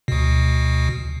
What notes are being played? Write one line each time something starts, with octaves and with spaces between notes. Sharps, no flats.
D2 B2